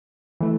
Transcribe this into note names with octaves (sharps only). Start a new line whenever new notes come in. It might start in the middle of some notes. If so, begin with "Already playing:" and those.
E3 A3